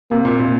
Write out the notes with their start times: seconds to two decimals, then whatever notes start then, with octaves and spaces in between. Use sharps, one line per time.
0.11 C3 A#3
0.25 A#2
0.40 A#2